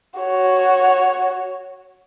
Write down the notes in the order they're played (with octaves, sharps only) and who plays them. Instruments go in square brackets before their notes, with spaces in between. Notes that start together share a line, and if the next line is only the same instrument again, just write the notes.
[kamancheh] F#4 C#5